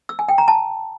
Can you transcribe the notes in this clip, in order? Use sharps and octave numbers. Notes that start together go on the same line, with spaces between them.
E6
G#5
G5
A#5
A5